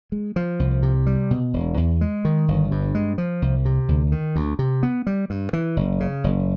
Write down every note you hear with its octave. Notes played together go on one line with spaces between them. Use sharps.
G#3
F3
C2
C3
G3
B2
E1
E2
G#3
D#3
G1
G2
G#3
F3
C2
C3
D2
D#3
D2
C3
B3
G3
G2
E3
F#1
C#3
F#1